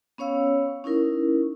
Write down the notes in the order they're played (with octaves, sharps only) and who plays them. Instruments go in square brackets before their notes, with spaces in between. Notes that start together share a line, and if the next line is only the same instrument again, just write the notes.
[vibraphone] B3 C#4 C#5 F5 E6
C#4 D#4 E4 A#4